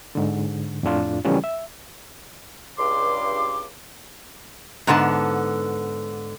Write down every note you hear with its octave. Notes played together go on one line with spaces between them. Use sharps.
G#2 D3
F2 A2 D4 F4
C#3 E3 F3 G3 A3 C#4
E5
C#2 G2 C6 D6
G#2 D3 B3 G4 A5